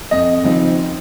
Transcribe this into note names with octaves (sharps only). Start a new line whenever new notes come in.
F2 D#5
C#3 F3 C4 D#4